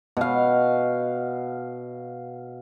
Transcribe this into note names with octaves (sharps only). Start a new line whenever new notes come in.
B2 F5